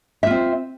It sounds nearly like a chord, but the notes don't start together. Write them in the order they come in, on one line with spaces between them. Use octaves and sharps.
E5 F4 C4